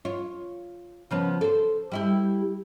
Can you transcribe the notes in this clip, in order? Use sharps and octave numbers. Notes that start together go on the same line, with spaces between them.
F4 C#5
C#3 F3 B3
A4 C5
G3 E4 G4